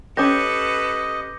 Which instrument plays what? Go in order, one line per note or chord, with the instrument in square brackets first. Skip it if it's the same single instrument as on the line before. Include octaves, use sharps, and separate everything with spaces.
[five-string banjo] C#4 G4 [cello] A4 B4 [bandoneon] D#5 [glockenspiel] D6 G6 A#6